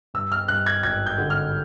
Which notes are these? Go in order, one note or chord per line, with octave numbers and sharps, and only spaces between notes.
G2 E6
F6
G2 F#6
G#6
G#1 G#6
G6
D3
F6